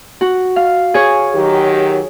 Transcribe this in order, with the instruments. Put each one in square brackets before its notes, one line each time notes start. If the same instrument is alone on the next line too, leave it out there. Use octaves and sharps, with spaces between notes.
[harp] F#4
F5
G#4 C#5
[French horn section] D#3 F#3 G4